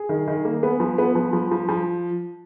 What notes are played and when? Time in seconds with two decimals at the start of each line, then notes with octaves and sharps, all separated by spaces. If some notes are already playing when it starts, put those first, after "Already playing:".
Already playing: G#4
0.09 D#3
0.28 D#3
0.45 A#3
0.63 B3
0.80 F3
0.98 B3
1.15 F3
1.33 F3
1.51 F3
1.69 F3